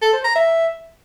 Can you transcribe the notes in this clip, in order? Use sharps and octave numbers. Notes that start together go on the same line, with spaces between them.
A4
C5
A#5
E5